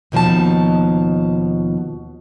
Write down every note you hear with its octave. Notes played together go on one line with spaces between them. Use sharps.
D#2 B2 F3 D#4 A5